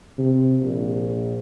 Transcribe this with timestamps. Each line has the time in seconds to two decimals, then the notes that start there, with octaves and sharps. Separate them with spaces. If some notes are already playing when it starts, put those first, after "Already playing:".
0.18 C3
0.62 A#1